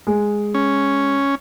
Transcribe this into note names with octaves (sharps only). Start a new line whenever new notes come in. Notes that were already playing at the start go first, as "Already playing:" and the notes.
G#3
C#4